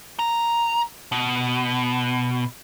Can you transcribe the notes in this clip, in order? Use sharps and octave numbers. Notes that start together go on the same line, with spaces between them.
A#5
B2